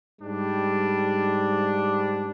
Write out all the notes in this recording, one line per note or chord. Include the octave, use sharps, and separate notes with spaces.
G#2 G3 D4